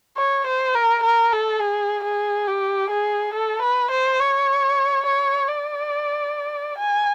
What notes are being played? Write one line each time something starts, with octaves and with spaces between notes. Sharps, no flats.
C#5
C5
A#4
A#4
A4
G#4
G#4
G4
G#4
A4
B4
C5
C#5
C#5
D5
G#5